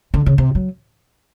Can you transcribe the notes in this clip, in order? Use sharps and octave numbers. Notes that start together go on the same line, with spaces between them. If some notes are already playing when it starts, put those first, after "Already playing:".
D3
C#3
C3
F#3